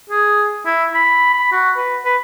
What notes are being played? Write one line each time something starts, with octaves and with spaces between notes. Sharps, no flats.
G#4
E4
B5
B5
F#4
B4
B4